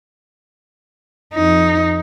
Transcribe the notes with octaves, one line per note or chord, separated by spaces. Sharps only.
F2 D#4